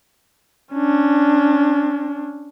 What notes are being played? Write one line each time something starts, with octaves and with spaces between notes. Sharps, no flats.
C#4 D4